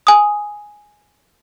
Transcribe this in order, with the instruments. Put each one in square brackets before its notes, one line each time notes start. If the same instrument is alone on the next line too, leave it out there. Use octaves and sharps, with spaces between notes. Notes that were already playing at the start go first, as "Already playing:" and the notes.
[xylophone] G#5 D#6